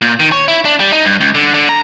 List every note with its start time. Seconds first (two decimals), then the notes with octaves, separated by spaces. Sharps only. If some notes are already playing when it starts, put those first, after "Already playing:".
0.02 A#2
0.20 D#3
0.32 C#5
0.48 E4
0.65 D4
0.80 G3
0.92 D#4
1.05 G2
1.21 C#2
1.35 D3
1.54 D3
1.69 A#5